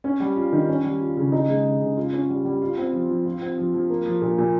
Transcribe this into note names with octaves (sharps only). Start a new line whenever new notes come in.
C#4
G3
F4
D#3
C#4
G3
F4
C#3
D#4
G#3
C#3
C#3
F4
C#4
G3
G3
F4
C4
F3
F3
F4
C4
F3
F3
A#3
F3
A#2
A#2